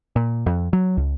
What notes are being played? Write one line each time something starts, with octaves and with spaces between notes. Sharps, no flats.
A#2
F2
F#3
C#2